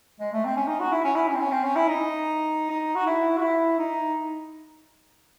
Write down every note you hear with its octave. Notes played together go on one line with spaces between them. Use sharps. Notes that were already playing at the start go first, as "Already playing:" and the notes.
G#3
A3
C4
C#4
D#4
F#4
E4
C#4
E4
C#4
C4
C#4
C4
C#4
E4
D#4
D#4
F#4
E4
F#4
E4
D#4